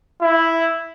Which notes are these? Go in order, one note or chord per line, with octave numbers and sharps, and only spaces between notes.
E4